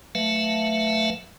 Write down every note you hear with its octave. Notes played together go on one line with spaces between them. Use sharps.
F#3 A3 B4 E5 F5 A5